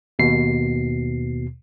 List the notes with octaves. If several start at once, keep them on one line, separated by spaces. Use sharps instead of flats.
D#2 B2 C7